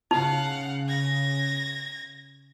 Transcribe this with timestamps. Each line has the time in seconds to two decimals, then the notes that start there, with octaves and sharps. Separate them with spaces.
0.11 C#3 D#4 F5 F#5
0.88 G#6 A#6